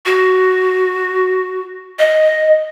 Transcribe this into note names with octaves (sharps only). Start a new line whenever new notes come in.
F#4
D#5